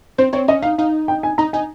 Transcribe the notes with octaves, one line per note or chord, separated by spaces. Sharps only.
C4 C5
C4 C#5
C#4 D#5
D#4 F5
D#4 F5
G5
G#5
D#4 A#5
D#4 G#5